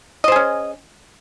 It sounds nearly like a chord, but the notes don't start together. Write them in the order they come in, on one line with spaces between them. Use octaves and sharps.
D#5 C5 G#4 C#4